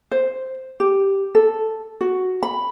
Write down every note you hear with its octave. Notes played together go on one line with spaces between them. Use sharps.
C5
G4
A4
F#4
B5